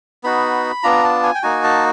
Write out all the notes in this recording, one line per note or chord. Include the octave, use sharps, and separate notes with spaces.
B3 D#4 F#4 B5
B3 D4 F4 A#5
A5
G#5
G5
A#3 D#4 F#4 G#5
A5